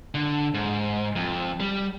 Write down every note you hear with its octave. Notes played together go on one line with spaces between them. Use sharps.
D3
G#2
F2
G3